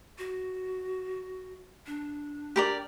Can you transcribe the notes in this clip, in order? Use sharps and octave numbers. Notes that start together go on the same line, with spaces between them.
F#4
D4
G4 A#4 D5